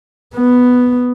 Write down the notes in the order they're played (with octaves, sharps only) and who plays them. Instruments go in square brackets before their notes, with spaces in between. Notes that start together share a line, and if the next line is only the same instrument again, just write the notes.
[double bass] B3